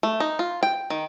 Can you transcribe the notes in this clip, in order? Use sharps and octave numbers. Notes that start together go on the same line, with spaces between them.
A3
D#4
F4
G5
D#3